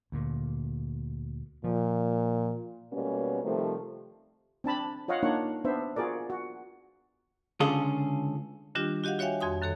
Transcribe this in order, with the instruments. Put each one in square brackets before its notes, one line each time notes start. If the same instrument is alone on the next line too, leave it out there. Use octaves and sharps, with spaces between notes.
[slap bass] D2 A#2
[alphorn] A#2 [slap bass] F3
[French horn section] B2 G3 G#3 A#3 B3 C#4
C3 D#3 F3 G3 A3
[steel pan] C4 D4 A5 B5
F4 C#5 D#5 F5 F#5
A#3 D4 D#4 C#5 F#5
B3 D4 C5 E5
F4 F#4 G#4 A#4 D5
F#4
[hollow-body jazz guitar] C#2 D3 C#4 F4 G#4 A4
[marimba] D#3 G3 D4 F4 G4
F#4 G4 D#5 F5 F#5
F#4 C#5 E5 F5 G5 G#5
F2 F#4 C6 D#6
F#2 D#3 A4 C#5